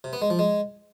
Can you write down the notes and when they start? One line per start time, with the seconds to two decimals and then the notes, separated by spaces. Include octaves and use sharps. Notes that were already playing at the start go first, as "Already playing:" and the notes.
0.04 C3
0.13 B3
0.22 G#3
0.30 F3
0.39 G#3